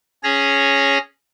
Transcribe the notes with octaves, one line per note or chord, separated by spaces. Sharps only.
C#4 G#4 C#5 A#6